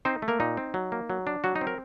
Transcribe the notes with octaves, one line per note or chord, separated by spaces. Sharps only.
C4 D#4 C5
A3
A#3 A#4
A#2 D#4
C4
F#3
A#3
F#3
D4
F#3 F#4
D#4
C4
A#4